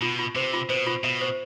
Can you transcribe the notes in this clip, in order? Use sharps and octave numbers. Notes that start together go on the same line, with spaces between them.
B2 F4
F4
C3 C5
F4
B2 C5
F4
B2 E5
C5